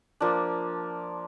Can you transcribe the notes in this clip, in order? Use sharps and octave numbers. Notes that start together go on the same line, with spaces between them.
F3 A#3 D4